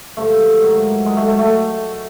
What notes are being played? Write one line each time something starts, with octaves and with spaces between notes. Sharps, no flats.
G2 D3 F3 A3
G#2 D#3 F#3
G#2 D#3 F#3 G#3
A3
A3
A3